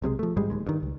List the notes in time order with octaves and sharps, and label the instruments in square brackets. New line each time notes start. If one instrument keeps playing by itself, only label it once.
[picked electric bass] B1 C3 F3 G#3
F3 A3
A1 G#2 G3 G#3
D1 D#2 G#3
G2 D#3
C#2